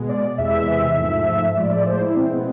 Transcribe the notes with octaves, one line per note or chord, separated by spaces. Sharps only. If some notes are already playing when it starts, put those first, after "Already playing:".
Already playing: B2 G#3
D5
E2 C3 E3 G#3 E5
G#2 F3 A3
A2 F3 G#3 D5
D5
C5
E4
B2 G#3 C4
B3